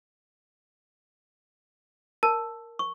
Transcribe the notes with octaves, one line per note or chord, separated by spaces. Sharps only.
A#4 A5
C#6